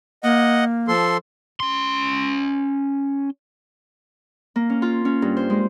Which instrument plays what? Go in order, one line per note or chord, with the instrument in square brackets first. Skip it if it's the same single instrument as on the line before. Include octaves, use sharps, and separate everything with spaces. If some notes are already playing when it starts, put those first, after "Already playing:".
[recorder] A#3 [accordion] D#5 F#5
[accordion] F3 A4 C6
[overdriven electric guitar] C#4 C6
[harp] A#3
C#4
F4
C#4
G2
C5
G#3